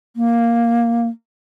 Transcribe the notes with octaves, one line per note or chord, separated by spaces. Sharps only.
A#3